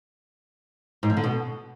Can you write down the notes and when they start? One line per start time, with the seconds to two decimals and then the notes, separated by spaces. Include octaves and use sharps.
1.03 G#2
1.10 F3
1.17 D3
1.24 B2